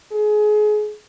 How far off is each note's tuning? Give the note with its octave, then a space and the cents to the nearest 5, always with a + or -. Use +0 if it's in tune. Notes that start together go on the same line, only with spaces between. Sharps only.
G#4 +25